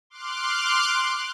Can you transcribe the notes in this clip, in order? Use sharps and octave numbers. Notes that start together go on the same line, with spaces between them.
C6 D6 F6 F#6